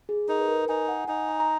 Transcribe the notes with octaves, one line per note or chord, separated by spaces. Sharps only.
G#4
D#4 A#4
B4
A#4
D#4 G#5
F#5
D#4 G#5
A#5
A#5